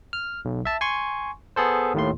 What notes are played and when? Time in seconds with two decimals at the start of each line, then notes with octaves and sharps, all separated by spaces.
0.13 F6
0.45 B1
0.65 E5 A5
0.81 G#5 C6 C#6
1.56 B3 G#4 A4 C5
1.94 D#2 A2 C6